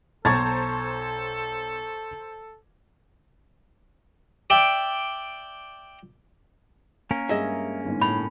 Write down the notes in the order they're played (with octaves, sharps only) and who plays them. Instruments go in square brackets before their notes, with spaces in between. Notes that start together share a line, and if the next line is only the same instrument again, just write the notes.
[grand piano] B1 [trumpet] A4 [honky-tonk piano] C5 A5 A#5 [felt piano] C#6 G#6 A6
[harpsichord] D5 E5 G5
[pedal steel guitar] A#3 C#4 A#4
[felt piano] G2 G#3 [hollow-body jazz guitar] G#4 D#5 E5
[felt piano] G1 G#2
[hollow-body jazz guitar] A2 [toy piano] B5